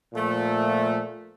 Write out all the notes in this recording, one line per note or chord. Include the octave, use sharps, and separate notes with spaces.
A#2 F3 A3